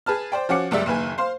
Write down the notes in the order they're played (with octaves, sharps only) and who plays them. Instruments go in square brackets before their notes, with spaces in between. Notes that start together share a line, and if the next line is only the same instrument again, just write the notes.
[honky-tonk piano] G#4 B4 A5 F6
C5 D5 G5
F3 C#4 F#4 D6 C#7
F#1 C#2 G3 D5 E5
F#1 D#2 B4 G#5
C5 F5 C6